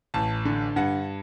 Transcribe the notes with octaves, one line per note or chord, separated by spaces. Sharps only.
A1 A5
D3
G2 F#5